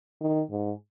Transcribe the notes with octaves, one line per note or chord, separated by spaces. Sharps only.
D#3
G#2